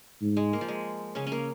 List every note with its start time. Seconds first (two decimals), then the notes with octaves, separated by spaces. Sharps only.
0.22 G#2
0.37 G#3
0.53 A#3
0.61 F3
0.68 G#3
1.15 C#3 C#4
1.27 C#4
1.32 A#3